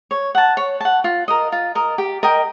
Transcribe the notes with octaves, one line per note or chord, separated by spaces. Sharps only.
C#5
F#5 A5
C#5
F#5 A5
F4
A#4 D#5
F4
A#4 D#5
G4
A#4 D#5 G5